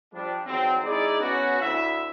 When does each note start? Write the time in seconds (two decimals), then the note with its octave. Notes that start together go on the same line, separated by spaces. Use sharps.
0.13 F3 G3 D4
0.46 E2 G#2 F#3 C4
0.84 G#3 D#4 E4 G#4 D5
1.20 B3 C#4 F#4
1.61 D2 E4 E5